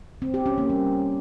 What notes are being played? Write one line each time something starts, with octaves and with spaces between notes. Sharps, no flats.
C4
G4
C#4
A#3
G3